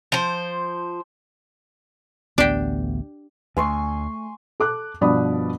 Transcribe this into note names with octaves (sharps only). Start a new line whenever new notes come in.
F3 C5
A1 D2 B3 D4 G4
D2 A3 G#5 C6 C#6
A4 D6 F#6
G2 B2 F3 D5 B5 D#6